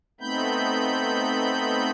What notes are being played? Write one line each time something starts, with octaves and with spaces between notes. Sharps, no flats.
A3 B3 C4 D#4 B5 G6